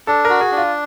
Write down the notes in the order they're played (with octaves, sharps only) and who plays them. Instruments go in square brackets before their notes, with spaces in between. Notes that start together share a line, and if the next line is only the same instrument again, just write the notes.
[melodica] D4 [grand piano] A4
[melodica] F#4 [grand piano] A#4
[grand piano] G#4
[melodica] D4
[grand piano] F4